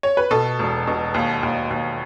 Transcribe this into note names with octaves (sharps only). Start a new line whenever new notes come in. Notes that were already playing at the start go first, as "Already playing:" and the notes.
C#5
B4
B2 A4
E1
B2
D#2
D#2
D#2